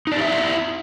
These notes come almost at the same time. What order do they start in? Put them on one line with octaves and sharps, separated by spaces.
D#4 D5 G4 E5 E4